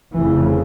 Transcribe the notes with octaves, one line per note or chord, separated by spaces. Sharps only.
F1 F2 C#3 E3